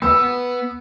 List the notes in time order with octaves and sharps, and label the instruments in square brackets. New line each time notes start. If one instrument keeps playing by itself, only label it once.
[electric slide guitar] B3 B4 [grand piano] E6